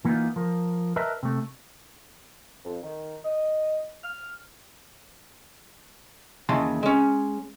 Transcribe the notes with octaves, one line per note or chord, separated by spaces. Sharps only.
E3 A#3 B3 C#4 D#4 F4
F3 A#4
A#4 B4 D#5 E5 A5 A#5
C3 A3
F2
D#3
D#5
F6
D#2 C#3 E3 A5 C6
G#3 C#4